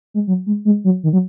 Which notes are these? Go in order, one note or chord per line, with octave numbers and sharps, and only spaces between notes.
G#3
F#3
G#3
G#3
F#3
D#3
F#3